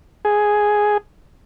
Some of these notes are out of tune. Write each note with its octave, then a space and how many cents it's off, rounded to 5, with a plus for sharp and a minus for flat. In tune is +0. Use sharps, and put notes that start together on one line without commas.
G#4 +5